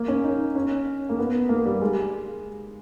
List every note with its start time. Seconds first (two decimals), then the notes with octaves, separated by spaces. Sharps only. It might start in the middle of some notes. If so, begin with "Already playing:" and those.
Already playing: A#3
0.08 C#4
0.24 D#4
0.55 C#4
1.09 A#3
1.18 B3
1.49 A#3
1.65 G3
1.81 G#3